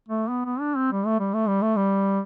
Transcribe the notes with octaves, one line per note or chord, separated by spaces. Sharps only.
A3
B3
B3
D4
C4
G3
A3
G3
A3
G3
A3
G3